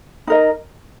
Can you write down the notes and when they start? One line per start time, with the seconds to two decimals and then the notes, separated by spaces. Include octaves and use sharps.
0.27 D#4 A#4 D#5